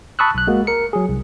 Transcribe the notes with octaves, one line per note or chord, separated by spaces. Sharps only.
A5 B5 C#6 D#6 E6 F#6
B1 F#6
G#3 A#3 F#4
A#4 C#7
F#3 G#4
C2